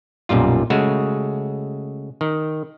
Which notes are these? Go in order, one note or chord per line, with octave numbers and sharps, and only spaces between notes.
B1 F#2 A#2 G3 F4
C#3 G#3 A3 F#4
D#3